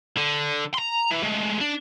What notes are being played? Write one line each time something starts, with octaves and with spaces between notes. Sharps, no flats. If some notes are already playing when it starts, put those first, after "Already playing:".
D3
A#5 C6
E3
G#3 A3
D4